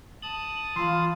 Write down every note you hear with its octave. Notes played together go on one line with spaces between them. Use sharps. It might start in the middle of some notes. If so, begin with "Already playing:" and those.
A5 D#6 F#7
E3 F4 C6